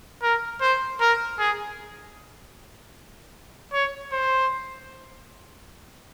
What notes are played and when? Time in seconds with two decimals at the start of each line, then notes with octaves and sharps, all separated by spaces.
0.23 A#4
0.61 C5
1.01 A#4
1.39 G#4
3.73 C#5
4.12 C5